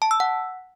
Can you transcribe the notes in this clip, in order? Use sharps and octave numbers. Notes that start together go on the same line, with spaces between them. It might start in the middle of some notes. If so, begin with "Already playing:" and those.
A5
E6
F#5